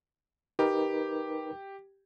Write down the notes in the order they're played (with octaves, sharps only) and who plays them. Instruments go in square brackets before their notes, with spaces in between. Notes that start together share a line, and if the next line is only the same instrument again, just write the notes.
[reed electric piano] D#4 A#4 B4 [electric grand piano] G4